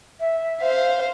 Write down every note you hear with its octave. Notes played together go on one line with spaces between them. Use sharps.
E5
C5 F5